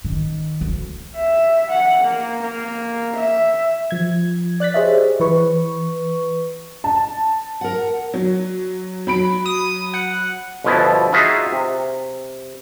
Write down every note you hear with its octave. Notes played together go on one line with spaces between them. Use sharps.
D#3
D2
E5
F#5
A#3
A#3
E5
F3 G#6
D5 F#6 A6 B6
G4 G#4 C5 C#5 D#5 E5
E3 B4 C#6
A5
A#4 F#5
F#3
F#3 B5 D7
D#6
F#5
G1 B2 F3 E4 G#5 A5
D#4 F4 F#4 G#4 E5 F5
C3